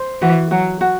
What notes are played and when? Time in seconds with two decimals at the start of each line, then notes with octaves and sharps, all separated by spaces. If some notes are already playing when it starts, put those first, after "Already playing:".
Already playing: C5
0.22 E3 F#4
0.51 F#3 F#4
0.81 F#4